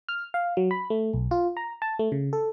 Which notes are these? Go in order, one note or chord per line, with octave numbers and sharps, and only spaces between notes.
F6
F5
F#3
B5
A3
B1
F4
A#5
A5
A3
C#3
A4